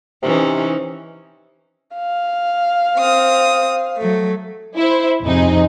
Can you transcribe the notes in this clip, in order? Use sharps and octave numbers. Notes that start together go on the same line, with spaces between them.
C3 E3 C#4 D#4
F5
C4 D#6
F#3 A3
E4 C5
F2 C3 D#4 G#4